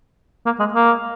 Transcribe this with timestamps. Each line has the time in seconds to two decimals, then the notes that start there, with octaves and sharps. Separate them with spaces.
0.45 A#3
0.59 G#3
0.74 A#3